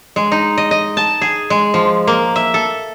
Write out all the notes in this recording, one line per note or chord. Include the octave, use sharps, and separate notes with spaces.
G#3
D#4
D#5
D#5
A5
G#4
G#3
F3
A#3
E5
A4